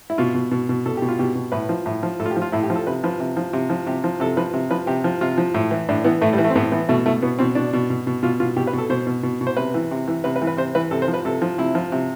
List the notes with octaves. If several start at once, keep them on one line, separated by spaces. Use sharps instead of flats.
E4
B2 F4
B2
B2
B2
B2 A4
B2 G4
F4
B2 G4
B2
A2 B4
F3
A2
F3
A2 A4
F4
G4
F3
F4
A2 E4
G4
F3
A4
C3 B4
F3 B4
C3
F3
C3
F3
C3 G4
F3
C3 A4
F3 B4
C3
F3 B4
C3 G4
F3
C3 F4
F3
A2
E3
A2 D4
E3 B3
A2 A3
G3
E3
A3
C4
A2 B3
E3 B3
B2 A3
B2 A3
B2 B3
B2 C4
B2 D4
B2
B2
B2
B2 F4
B2 F4
B2 G4
B4
B2
A4
B2 C5
B2
B2
B2
C5
C3 B4
E3
C3
E3
C3 B4
B4
E3
B4
C3 C5
E3 B4
C3 A4
C5
F3
B4
C3 A4
F3
C3 E4
F3
C3